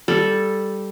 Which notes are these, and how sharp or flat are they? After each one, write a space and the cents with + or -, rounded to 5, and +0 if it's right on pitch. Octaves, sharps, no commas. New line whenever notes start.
G3 +0 A4 +0